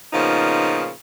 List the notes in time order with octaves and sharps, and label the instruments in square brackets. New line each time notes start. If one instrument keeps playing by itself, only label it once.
[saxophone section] A#2 C#3 F3 B3 D#4